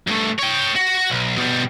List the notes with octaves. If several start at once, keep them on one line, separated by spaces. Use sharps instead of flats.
G2 A3
C#5 G5
F#4
B1
B2 G3